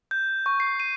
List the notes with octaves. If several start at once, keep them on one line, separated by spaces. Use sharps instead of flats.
G6
C#6
C7
D#7